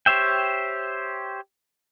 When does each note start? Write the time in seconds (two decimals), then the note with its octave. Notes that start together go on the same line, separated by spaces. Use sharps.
0.06 G4 C5 C#5 E5 G5